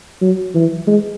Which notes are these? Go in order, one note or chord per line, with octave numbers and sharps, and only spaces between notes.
F#3
E3
G#3